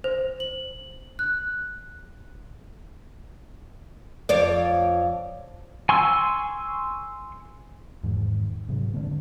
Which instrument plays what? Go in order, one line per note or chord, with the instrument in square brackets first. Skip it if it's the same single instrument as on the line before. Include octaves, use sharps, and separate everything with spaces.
[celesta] C5
F#7
F#6
[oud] F2 C#5 D5
[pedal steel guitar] G#5 C6 C#6 E6
[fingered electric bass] E2 G#2 D#3
G#2 C3 F#3
D3 G#3 A3 C4